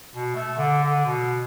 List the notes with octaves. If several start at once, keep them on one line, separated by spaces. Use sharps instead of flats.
B2
A3
D3
D3
B2